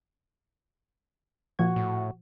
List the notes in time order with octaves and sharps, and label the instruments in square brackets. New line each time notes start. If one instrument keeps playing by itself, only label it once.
[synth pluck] A#2 F3 G#6 [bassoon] F#4
[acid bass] A2